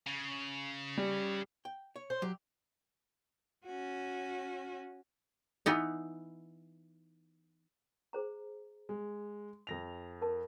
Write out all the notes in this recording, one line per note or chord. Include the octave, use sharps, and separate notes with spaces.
C#3
G3
G5
C#5
C5
F#3 G4
C#4 F#4
E3 B3 D#4
G#4 C5 A#5
G#3
F2 A#6 F7
A#4 A5